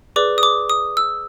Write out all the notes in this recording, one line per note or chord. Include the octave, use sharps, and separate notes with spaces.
G#4 B4 D5 D6
D#6
D6
D#6
E6